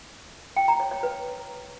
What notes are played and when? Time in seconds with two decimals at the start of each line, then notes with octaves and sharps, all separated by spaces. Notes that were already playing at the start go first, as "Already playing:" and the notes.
0.56 G5
0.68 A#5
0.80 C#5
0.91 C#5
1.03 B4